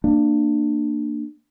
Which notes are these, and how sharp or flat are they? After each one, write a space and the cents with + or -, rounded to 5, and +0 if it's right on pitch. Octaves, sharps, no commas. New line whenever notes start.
A#3 -15 D4 +20